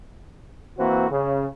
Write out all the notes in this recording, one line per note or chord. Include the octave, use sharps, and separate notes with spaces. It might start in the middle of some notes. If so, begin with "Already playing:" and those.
E3 A#3 C4 F#4
C#3